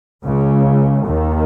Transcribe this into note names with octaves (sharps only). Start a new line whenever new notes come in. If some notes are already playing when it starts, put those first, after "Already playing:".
C#2 C#3
D#2 D#3